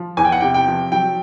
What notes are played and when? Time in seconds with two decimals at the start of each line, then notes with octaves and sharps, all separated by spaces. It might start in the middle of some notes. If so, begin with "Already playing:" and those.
Already playing: F3
0.17 E2 G#5
0.25 G5
0.32 F#5
0.41 C3 G5
0.54 G5
0.67 F3
0.92 F#3 G5